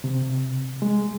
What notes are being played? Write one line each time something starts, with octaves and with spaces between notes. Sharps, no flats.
C3
G#3